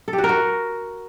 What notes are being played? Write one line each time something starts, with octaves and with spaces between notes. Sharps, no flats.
A4
G4
F#4
A#4
F#4